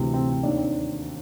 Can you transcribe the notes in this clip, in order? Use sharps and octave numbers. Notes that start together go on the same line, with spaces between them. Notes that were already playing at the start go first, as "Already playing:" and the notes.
Already playing: D2 C3 E3
C4
C4
D#2 D#3 D4
C4